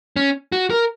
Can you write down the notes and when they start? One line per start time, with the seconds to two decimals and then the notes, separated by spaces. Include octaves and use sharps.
0.16 C#4
0.52 F#4
0.70 A#4